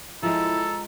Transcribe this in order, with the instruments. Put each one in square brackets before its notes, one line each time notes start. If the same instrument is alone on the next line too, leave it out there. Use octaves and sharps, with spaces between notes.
[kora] F3 G#3 [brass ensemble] E4 [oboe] A4 [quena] A#5